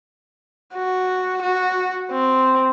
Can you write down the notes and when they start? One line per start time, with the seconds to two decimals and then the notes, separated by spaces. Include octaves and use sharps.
0.74 F#4
1.43 F#4
2.12 C4